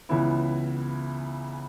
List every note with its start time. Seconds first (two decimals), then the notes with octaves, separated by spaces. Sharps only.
0.09 C#2 C#3 E3 B3 E4